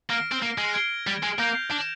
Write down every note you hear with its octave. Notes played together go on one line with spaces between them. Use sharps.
A#3 F6 A#6 D7
C4
A#3
G#3
G#6 D7 G7
G3
G#3
A#3 G6 A#6 D7 F7
D4